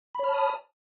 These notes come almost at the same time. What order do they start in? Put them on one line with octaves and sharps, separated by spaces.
B5 C#5 F6 A5 D#6